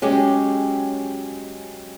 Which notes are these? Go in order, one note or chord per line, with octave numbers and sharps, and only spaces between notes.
F#3 G#3 C#4 G4